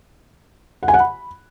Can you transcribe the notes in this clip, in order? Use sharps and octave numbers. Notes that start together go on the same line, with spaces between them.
F#5
G#5
F#5
B5